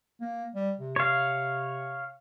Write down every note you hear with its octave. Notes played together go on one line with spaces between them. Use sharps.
A#3
G3
C3
C#5 F5